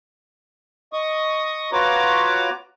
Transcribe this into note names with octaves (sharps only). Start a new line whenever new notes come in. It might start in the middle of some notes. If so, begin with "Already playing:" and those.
D#5 C#6 D#6
F4 F#4 B4 C#5 A#5 D6